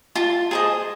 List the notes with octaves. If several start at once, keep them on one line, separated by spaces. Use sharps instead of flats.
F4 A5
G#4 C5 D#5